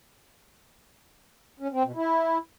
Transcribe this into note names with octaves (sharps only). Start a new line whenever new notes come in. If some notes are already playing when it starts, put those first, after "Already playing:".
C#4
C4
B2
E4